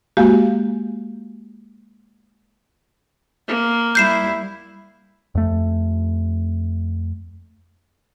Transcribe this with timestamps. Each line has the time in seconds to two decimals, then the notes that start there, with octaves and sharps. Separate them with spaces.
0.17 G#3 A#3 F#4 G4 F5
3.48 A#3
3.95 G3 E4 G6 C7 E7
5.35 F2 A3